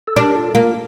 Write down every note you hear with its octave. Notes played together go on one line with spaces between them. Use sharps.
A4
D4 G4 A#4
F4 A4
A#3 F4